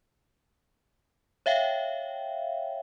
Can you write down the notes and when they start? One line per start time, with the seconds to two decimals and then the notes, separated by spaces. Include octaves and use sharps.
1.46 C#5 E5 F5 G5